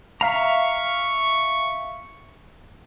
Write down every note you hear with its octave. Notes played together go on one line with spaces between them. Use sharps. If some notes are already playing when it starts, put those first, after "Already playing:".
E5 F5 A#5 C#6